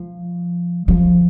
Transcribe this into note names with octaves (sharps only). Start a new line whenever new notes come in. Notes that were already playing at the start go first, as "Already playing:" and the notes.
Already playing: F3
F3